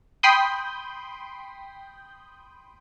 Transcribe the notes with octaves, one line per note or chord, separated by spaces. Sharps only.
G5 B5 C6 D#6 G6